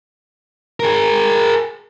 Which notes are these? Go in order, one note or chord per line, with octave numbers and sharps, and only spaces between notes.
G#4 A#4